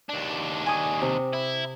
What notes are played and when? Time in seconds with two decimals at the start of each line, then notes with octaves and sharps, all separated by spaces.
0.09 D#2 D4
0.66 G#5 C#6 D#6
1.02 C3
1.33 E4